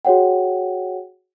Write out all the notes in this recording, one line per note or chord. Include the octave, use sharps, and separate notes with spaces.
F#4 G#4 C#5 F#5 G5